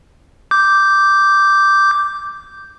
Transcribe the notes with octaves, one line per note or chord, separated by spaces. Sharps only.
D6 G6